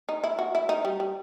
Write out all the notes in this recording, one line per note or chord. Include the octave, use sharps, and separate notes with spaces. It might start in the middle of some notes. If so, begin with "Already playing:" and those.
D#4
E4
F#4
E4
D#4
G3
G3